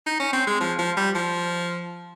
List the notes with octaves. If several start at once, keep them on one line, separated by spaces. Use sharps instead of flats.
D#4
C#4
C4
G#3
F3
F3
G3
F3